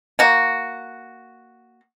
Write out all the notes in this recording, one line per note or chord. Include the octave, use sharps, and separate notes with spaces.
A#3 F#4